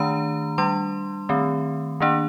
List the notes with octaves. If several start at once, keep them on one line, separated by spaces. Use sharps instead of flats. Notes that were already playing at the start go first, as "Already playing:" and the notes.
Already playing: D#3 A3 D4 A#5
G3 D4 C6
D#3 A3 C4
D#3 A#3 D4